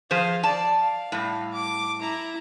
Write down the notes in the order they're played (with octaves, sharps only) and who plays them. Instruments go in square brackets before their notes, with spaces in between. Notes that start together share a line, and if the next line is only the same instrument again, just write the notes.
[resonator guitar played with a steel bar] F3 G#4 C5 [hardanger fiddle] F5
[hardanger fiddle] D5 [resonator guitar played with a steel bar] A5
[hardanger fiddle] F5
[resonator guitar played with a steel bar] A2 G3
[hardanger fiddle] D6
E4 A#5